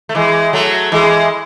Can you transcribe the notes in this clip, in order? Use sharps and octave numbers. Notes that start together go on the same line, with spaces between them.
A3
E3 G#3
F#3 A3
E3 G#3